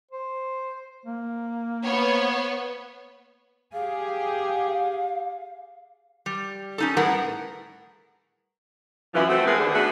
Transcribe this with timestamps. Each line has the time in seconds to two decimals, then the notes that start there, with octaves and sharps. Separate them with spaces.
0.11 C5
1.06 A#3
1.84 B3 C5 C#5
3.73 G4 G#4 F5
6.26 G3
6.78 C#4 D#4 A4
6.97 A2 G3 G#4 A#4 B4 F#5
9.14 F#2 E3 F3
9.28 A3 C4 F#4
9.46 G#3 A3 B3 G#4 A#4 B4
9.58 D#2 D3 G#4
9.73 A3 B3 D4 F#4 G#4